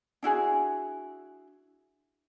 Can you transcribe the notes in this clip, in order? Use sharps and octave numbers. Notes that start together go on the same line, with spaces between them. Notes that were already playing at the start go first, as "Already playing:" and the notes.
D4 E4 F#4 G#4